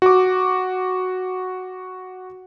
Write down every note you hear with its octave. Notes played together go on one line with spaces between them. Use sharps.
F#4 D6